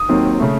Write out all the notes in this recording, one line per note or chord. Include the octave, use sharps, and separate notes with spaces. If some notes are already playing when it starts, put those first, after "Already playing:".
Already playing: D#6
D#2 D#3 F#3 C4
C#3 A3